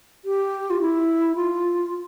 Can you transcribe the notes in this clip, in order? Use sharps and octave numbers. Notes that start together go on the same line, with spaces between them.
G4
F4
E4
F4